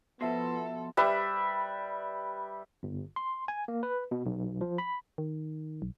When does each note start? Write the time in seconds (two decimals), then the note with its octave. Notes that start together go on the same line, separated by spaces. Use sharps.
0.21 B2 F3 B3 A4 E5 C6
0.97 G3 B4 E5
2.83 G1
3.16 C6
3.48 G#5
3.68 A#3
3.83 B4
4.11 B2
4.26 B1
4.61 F3
4.78 B5
5.18 D#3
5.82 B1